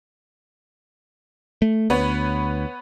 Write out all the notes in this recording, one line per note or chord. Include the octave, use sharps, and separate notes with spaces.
A3
D2 B3 B4 C#5